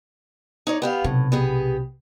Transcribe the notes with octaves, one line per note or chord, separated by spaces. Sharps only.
D#4 C#5 D5
B3 G4 F5
B1 A2 C3
B3 G4 G#4